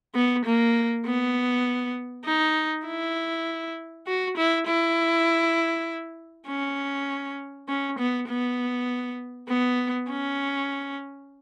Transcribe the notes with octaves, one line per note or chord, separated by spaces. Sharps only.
B3
A#3
B3
D#4
E4
F#4
E4
E4
C#4
C#4
B3
B3
B3
C#4